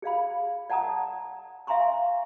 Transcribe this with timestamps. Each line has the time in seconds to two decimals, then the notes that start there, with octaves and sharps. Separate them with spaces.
0.02 G#4 D5 F5 B5
0.70 D5 F#5 A5 A#5 D#6
1.67 E5 F5 G#5 A#5 C6 C#6